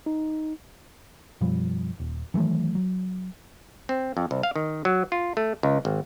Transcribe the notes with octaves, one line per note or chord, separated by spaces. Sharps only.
D#4
F#2 B2 F3 G3
D#1
D#3 E3 F#3 A3
F#3
C4
F2
C2
F5
D#3
F#3
F4
A3
C#2
G#1